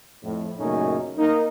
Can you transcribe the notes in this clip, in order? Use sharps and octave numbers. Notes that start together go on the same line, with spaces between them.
F2 A2
F#2 A#2 C#3 A3 C#4 D#4
A#3 D#4